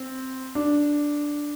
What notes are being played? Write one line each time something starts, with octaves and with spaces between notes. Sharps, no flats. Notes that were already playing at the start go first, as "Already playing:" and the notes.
Already playing: C4
D4